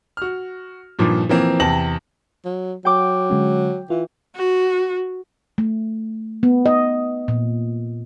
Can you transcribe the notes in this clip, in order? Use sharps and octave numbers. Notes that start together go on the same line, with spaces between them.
F#4 F6
G2 A#2 D#3 F3
E3 F3 A#3 C4
E2 C3 G5 A5 A#6 F#7
F#3
F#3 G5 D6
D3 G#3 C#4
E3 F4
F#4
A3
B3
D#5
A#2